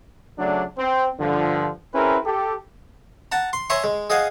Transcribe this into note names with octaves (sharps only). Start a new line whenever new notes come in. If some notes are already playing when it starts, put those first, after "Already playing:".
C#3 F#3 A3 D4
C4
G2 D3 F3
C4 C#4 E4 G#4 A#4 B4
G4 A4
F#5 A5 A#5
C6
C#5 E5 G#5 A#5 C6 C#6
G#3
G#4 D#5 F5 F#5 G#5